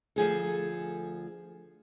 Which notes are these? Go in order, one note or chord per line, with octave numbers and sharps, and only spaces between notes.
D2 F3 G#4 A4